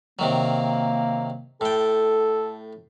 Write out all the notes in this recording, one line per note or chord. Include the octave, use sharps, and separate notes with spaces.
C3 D#3 F#3 A#3
A2 A4 G5